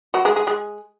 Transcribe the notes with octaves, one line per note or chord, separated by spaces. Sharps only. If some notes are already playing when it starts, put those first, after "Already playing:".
F#3 F#4
G#3 G#4
G#3 G#4
G#3 G#4